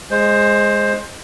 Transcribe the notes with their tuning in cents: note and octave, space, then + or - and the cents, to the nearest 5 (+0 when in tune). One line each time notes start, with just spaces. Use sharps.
G#3 +0 C5 +15